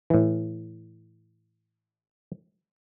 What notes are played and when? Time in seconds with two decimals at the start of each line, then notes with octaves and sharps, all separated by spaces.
0.10 A2 E3